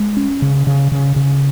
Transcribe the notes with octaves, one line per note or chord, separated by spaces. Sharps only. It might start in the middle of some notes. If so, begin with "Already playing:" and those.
Already playing: G#3
C#4
C#3
C#3
C#3
C#3